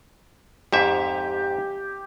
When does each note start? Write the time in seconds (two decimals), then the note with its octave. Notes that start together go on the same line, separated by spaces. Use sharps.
0.73 F2 G#2 G4 E5